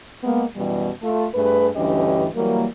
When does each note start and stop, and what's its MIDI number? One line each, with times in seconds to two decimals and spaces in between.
0.23 0.44 56
0.23 0.44 58
0.23 0.44 59
0.56 0.89 42
0.56 0.89 47
0.56 0.89 52
0.56 0.89 55
1.02 1.26 57
1.02 1.26 65
1.02 1.26 69
1.34 1.68 43
1.34 1.68 57
1.34 1.68 68
1.34 1.68 71
1.76 2.27 38
1.76 2.27 43
1.76 2.27 52
1.76 2.27 61
1.76 2.27 67
1.76 2.27 75
2.35 2.66 52
2.35 2.66 54
2.35 2.66 55
2.35 2.66 58